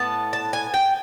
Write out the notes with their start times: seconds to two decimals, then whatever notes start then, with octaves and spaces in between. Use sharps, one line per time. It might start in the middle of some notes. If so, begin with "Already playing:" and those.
Already playing: A2 B3 A5
0.33 A5
0.53 G#5
0.74 G5